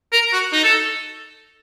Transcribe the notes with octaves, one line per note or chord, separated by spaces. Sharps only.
A#4
F#4
D#4
A4